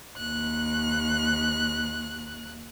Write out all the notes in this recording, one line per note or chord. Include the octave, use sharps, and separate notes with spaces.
D#2 F#6